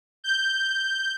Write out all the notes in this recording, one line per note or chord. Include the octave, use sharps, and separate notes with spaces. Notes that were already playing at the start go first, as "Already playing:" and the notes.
G6